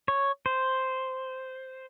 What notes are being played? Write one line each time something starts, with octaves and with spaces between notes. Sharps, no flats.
C#5
C5